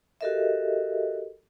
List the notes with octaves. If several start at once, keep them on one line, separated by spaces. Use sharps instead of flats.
F#4 G4 A4 A#4 D#5 E5